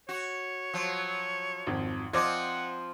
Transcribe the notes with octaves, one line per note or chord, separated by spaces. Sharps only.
F#4 C#5
F3 F#3
G#1 F2
F3 C4 F4 C5 D5 D#5 F#5 G#6